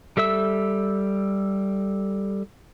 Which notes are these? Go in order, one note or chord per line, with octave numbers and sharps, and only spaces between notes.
G3 A4 E5 E6